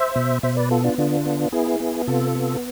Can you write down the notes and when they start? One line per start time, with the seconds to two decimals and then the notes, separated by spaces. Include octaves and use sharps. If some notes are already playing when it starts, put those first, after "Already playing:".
Already playing: C5 E5
0.16 B2
0.43 B2 C5 E5
0.57 B4 D5
0.71 B3 F4 A4
0.84 D4 F4
0.98 D3 D4 F4
1.25 B3
1.52 B3 E4 G#4
1.80 B3
2.07 C3 F4 A4
2.35 B3